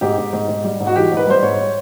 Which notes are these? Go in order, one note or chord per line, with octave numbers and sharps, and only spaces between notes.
G#2 G4
G#2
G#2
G#2
G3
G#2
F#4
E3 G4
G#2
B4
G3 C5
G#2 C#5